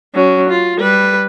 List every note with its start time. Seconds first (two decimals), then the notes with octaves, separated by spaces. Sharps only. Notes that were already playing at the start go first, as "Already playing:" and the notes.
0.15 F#3 C#4
0.49 F4
0.79 G3 B4